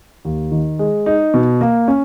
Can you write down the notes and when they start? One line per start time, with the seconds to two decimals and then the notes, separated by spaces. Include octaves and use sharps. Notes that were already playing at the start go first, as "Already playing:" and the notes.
0.25 D#2
0.51 D#3
0.79 G#3
1.06 D#4
1.34 B2
1.61 A#3
1.88 C#4